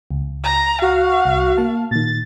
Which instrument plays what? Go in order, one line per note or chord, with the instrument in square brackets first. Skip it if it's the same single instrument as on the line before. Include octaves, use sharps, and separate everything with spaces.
[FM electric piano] C#2
[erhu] A#5
[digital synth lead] F#4 [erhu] F5
[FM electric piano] C2
A#3 A5
[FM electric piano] A#2 D#3 [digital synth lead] A6